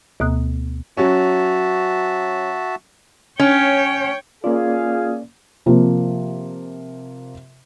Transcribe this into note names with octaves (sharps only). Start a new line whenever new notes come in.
D2 B2 A#3 A#5 D#6 F#6
F#3 C#4 F#4 E5 A5
C#4 C#5 G5
A#3 C#4 F4 G#4 D5 F5
C3 F3 A#3